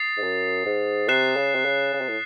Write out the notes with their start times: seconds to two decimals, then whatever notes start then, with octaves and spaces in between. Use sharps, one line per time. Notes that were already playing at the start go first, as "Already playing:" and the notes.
Already playing: D#6 A6 C7
0.17 G#2
0.23 F#2
0.66 G#2
1.08 C3 F#6 C7 E7
1.36 C#3
1.55 C3
1.65 C#3
1.94 C#3
2.01 C3
2.09 A2